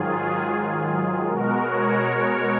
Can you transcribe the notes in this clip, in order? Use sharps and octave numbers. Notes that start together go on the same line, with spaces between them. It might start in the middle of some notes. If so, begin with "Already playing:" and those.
Already playing: G#2 D#3 F#3 F4 G#4
B2 G#3 F#4 A#4
A#4 C#5
A#4 C#5